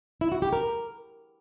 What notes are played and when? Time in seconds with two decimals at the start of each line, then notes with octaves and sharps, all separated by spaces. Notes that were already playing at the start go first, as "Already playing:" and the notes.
0.21 E4
0.32 F#4
0.42 G4
0.53 A#4